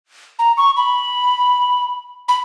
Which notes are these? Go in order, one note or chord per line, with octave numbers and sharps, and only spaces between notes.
A#5
C#6
B5
B5